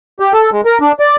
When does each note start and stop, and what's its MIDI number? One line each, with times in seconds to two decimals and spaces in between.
0.20 0.33 67
0.33 0.50 69
0.52 0.61 56
0.65 0.78 70
0.81 0.92 62
1.00 1.16 74